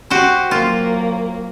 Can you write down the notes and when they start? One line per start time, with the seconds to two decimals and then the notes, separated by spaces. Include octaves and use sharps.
0.10 F#4 G4 C5
0.51 F#3 A#3 F4